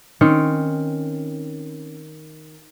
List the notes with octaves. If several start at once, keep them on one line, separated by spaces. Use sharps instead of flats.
D#3 C4 C#4